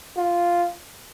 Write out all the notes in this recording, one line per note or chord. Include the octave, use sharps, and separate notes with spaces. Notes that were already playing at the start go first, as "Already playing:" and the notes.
F4